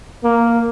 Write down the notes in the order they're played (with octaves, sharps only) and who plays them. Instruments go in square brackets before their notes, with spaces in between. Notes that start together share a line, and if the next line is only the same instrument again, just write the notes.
[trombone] A#3